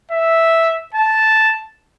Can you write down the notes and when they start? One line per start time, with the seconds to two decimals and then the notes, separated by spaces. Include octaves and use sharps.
0.11 E5
0.94 A5